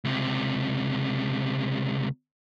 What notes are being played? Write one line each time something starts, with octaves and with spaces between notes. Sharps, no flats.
C#2 C3